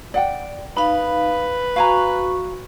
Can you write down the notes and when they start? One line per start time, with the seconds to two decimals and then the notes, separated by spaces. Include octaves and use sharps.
0.14 D5 F#5 G5
0.77 D#4 B4 F5 B5
1.76 F#4 F5 G#5 A#5 C#6